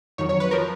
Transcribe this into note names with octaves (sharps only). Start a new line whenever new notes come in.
F2 D#3 F#3 C#5
C#5
B4
F3 A#4